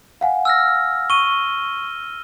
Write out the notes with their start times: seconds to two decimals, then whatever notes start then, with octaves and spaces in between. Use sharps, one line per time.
0.21 F5 F#5 G#5
0.45 E6 F6 A#6
1.10 C#6 D#7 G7